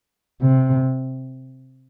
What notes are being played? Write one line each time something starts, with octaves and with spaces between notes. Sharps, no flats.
C3